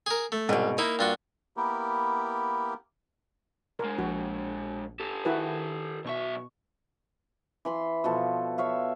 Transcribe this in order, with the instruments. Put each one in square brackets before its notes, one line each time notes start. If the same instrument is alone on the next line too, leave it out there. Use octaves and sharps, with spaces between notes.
[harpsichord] G#4 A#4
A3
[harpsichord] C2 [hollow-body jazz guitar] G#2 B2
[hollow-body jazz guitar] A#3 [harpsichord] D#4 E4
[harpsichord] G2 F4 F#4
[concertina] A#3 B3 E4 G4 A#4
[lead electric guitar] B2 G#3 [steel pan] A#4
[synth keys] A#1 [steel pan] F#4
[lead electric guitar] G4 A4
[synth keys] D#3 [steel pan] E4 F#4 B4
[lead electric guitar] B1 E5 [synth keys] B2 C#6
[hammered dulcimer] E3 B5 C6
B2 F3 A4
C#5 E5 F5